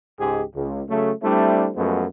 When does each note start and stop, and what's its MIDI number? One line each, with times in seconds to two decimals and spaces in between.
0.20 0.43 37
0.20 0.43 44
0.20 0.43 56
0.20 0.43 67
0.20 0.43 68
0.55 0.83 37
0.89 1.11 49
0.89 1.11 54
0.89 1.11 57
1.23 1.70 55
1.23 1.70 57
1.23 1.70 60
1.23 1.70 62
1.23 1.70 64
1.76 2.05 42
1.76 2.05 53
1.76 2.05 56
1.76 2.05 57
1.76 2.05 59